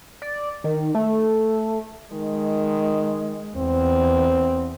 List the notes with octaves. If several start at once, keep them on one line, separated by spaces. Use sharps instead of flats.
D5
D#3
A3
D#3 G#3
E2 C4